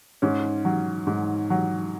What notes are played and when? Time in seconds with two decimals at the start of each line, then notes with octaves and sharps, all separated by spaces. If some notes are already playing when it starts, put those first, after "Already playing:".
0.22 G#2 C#4
0.65 F#3
1.07 G#2
1.50 F#3